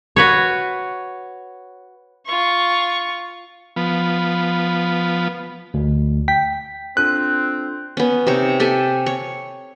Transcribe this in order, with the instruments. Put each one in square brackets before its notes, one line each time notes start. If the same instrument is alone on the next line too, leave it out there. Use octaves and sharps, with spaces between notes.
[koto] F#4 B4 C#5
[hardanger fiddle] F4 C#6
[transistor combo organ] F3 B3
[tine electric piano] D2
[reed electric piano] G5 [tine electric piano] B6
[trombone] C4 [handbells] D4 F4 A4 [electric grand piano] F#6
[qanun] B3 C#4
C3 D#4 C#5
G4 A4 E5 G#5
C#5